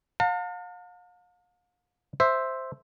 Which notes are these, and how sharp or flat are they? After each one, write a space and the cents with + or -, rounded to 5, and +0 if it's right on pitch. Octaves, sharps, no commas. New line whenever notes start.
F5 +40 A5 +45
C5 +0 E5 +0